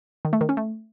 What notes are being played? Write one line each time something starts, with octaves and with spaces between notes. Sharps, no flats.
D#3
A3
D#3
C#4
A3